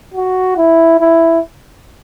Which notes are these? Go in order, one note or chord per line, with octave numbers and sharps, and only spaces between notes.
F#4
E4
E4